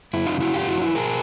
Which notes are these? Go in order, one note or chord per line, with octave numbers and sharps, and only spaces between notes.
F#2 E4
D#4 F4
C#3
E4 F#4
F#2 F4 G4
E4 F#4
F3
E4
B2 G#4 A#4